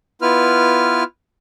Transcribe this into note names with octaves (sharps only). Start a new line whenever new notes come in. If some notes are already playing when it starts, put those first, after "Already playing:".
B3 E4 F4 B4 F6